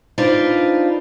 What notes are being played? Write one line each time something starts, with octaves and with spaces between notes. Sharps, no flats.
D4 D#4 F4 B4 C5 D5